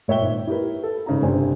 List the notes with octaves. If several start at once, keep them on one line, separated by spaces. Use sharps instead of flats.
A#2 C#5 E5 G5 G7
G#1
E4 G4 A#4 B4
A4
G#1 C#3 D#4 A#5
G1 C3 C5 G#5